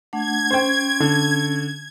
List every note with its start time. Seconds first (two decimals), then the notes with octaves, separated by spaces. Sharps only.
0.13 A3 D4 F#5 G#6
0.51 C#4 C5 G5
1.00 D3